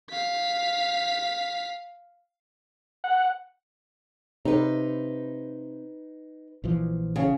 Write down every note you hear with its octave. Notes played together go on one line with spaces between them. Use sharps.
F5 B6
F#5
C3 D#4 B4
A#1 E3 F3
C#3